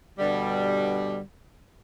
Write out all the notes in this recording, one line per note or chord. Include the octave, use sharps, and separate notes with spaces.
G2 B2 D3 G3